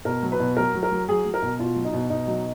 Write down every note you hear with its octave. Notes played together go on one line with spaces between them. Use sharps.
B2 A#4
F#3
B4
B2
F#3 A#4
F#3
A#4
F#3
F#3 G#4
F#3
A#4
B2
B2 F4
F#3
D#4
B2
B2 D#4
F#3